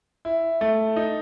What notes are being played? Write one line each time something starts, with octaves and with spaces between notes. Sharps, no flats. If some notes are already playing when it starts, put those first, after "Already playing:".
E4
A3
D#4